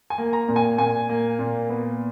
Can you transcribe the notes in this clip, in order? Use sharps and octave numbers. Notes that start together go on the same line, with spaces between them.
G#5
A#3
A#5
A#2
G#5
A#2 G#5
A#3
A#2
B3